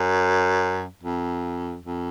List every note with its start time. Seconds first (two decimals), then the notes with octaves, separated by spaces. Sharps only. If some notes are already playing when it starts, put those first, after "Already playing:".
Already playing: F#2
1.03 F2
1.85 F2